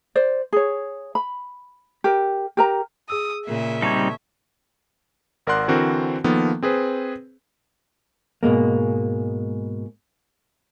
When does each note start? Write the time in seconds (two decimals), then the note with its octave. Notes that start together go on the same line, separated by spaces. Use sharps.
0.15 C5 D5
0.53 G#4 C#5
1.15 B5
2.04 G4 A#4
2.57 G4 A#4 A#5
3.10 G#4 D#6 E6
3.47 A#2 C#3 E5
3.82 G3 C4 D#4 A5 C#6 G#6
5.47 G#1 A#4 D5 F#5 C6 F#6
5.68 D3 E3 C4 F#4 A#4 C5
6.24 D#3 F3 A#3 B3 A4
6.62 C4 G#4 B4 C5
8.43 G#2 B2 G#3 A#3